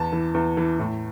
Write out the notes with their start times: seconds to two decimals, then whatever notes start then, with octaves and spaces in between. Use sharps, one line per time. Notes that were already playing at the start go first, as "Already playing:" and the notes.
Already playing: E2 A5
0.12 E3
0.34 E2
0.57 E3
0.79 A2